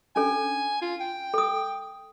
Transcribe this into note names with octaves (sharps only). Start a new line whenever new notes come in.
C#4 D4 A4 G#5
F4
G5
A4 D#6